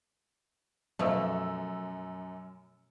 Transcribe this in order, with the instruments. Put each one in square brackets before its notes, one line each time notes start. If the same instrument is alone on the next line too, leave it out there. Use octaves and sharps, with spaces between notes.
[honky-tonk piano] F#2 E6 [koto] B2 F3 A3